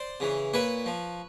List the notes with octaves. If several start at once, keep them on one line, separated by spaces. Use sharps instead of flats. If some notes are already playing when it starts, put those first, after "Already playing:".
Already playing: C5 D5
C#3 E3
A#2 B4 C#5
F3